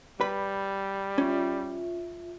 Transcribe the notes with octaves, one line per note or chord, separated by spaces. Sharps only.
G3 B4 B5
C#4 F4 E5